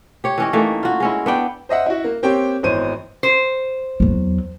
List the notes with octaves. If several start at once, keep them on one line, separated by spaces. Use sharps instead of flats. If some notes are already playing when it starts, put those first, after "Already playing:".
G4 C#5
E3 C#4 D#5
E3 A3 A#3 D#4
F4 F#4
G#3 C#4 E4
B3 D4 G5
C5 D#5 E5 F#5
E4 F#4
A#3
A#3 C4 G4 C#5 G5
G#1 E3 B3 C5 C#5 D#7
C5
E2 F#3